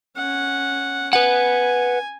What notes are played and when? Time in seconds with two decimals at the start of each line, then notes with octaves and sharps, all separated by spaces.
0.16 C#4 F#5
1.13 B4 F#5 G#5